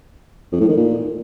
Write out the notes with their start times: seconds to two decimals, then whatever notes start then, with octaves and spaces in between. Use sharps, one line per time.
0.52 F2
0.61 A2
0.69 D#3
0.77 A#2